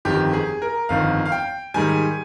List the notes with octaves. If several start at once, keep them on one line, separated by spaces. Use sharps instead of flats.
G1 F2 D#3 G4
G#4
A#4
G1 F2 D#3 F5
F5
G5
G#2 D#3 G3 G#5